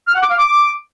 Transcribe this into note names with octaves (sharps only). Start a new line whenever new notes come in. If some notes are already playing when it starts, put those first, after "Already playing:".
F6
F#5
D6
F5
D6